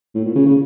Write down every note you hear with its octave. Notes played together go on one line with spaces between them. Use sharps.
A2
A#2
C#3
C#3